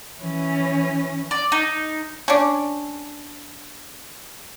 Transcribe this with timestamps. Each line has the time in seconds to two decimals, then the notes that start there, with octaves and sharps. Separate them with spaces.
0.20 E3 C#4
1.31 D5
1.52 D#4
2.28 C#4 D4